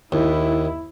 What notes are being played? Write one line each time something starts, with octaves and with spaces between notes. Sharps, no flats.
D#2 E4